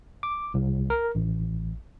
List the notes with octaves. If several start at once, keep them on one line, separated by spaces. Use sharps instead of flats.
D6
C2
A#4
A1